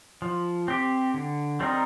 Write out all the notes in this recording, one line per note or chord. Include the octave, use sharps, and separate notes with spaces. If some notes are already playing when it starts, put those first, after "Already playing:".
F3
C4 G4
D3
G3 C4 D#4 A#4